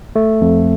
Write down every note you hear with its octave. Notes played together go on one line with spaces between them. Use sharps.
A3
F2